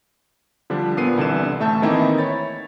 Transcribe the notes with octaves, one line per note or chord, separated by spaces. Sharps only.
D3 F3 G3 D4
A#2 B3 C7 D#7
C2 D3 E3 E7
A1 A3 E5 A5 G6
D#3 E3 A#3 C4 D#4 E4
C#5 B5 A6